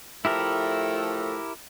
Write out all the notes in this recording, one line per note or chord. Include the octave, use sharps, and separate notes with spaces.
A2 F3 A3 E4 G4 A#4